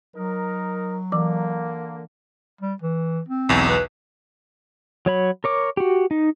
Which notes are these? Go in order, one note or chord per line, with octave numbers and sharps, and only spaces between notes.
F#3 D#4 A#4
D3 E3 A#3 D6
G3
E3
C4
B1 E2
B4
F#3 C#5 B5
A#4 C#5 D6
F#4 G4
D#4